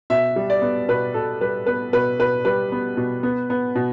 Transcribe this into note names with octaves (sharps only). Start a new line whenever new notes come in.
B2 E5
G3
D5
B3
B2 B4
B2 A4
G3 B4
B3 B4
B2 B4
B2 B4
G3 B4
B3
B2
B3
B3
B2